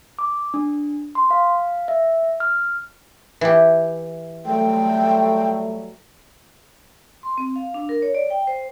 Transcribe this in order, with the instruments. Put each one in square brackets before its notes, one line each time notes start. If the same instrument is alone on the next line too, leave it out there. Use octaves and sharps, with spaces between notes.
[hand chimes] D6
D4
C6
F5
E5
F6
[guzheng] E3 G4
[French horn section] F#3 G3 A3 [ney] G5
[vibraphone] C6
C4
F5
D4
A#4
C#5
D5
G5
C5